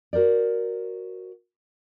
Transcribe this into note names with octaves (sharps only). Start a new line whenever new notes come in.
F#4 A#4 C5 D5